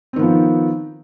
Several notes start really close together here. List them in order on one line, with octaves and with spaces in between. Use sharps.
C4 D#3 B3 F3